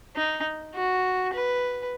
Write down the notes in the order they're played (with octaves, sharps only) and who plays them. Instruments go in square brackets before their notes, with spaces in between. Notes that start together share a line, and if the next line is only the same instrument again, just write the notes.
[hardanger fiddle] D#4
F#4
B4